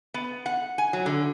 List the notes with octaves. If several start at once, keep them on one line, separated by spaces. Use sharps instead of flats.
B3
F#5
G#5
F#3
D3